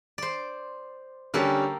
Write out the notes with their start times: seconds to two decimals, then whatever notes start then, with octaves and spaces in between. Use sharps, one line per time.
0.18 C5 D5
1.34 D3 G3 A#3 C#4 G4 A4